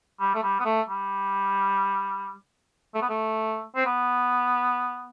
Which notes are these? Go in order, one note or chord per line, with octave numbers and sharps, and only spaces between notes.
G3
A3
G3
B3
A3
G3
A3
B3
A3
C4
B3